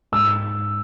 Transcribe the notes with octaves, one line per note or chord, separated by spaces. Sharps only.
G#2 E6